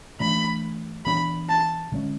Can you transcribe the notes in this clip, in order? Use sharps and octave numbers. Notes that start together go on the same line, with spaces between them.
E3 A3 D4 B5
E3 B3 D4 B5
A5
D3 G#3 C#4